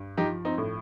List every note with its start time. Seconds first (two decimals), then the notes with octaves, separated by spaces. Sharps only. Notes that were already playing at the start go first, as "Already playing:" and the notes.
Already playing: G2
0.17 F3 D#4 G4
0.45 C4 D#4
0.58 A2